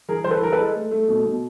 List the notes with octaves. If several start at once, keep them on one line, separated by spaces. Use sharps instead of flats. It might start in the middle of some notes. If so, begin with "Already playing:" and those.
E3 G#4 A#4
E3 C5
A4 B4
E3 A#4
A4 B4
G#3
A3
A3
B2
B2